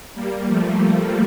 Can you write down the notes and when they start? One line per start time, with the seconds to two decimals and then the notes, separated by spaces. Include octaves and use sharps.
0.14 G3 A#3
0.47 F3 A3